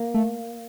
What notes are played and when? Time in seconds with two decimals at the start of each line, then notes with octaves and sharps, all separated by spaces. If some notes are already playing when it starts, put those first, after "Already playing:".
Already playing: A#3
0.14 A3